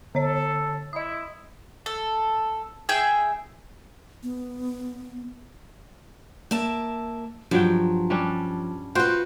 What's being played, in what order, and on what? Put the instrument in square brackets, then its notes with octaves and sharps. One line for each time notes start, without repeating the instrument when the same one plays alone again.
[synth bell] D3 C#5 [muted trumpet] A4
[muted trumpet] E4 [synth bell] D#5 D#6
[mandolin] A4
G#4 E5 G5
[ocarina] B3
[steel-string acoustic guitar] A#3 E5 A5
[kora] G2 F#3 G5 [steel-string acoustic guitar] F3
[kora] G3 C#4 D4
[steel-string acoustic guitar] F4 B4 [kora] F#4 C5 G5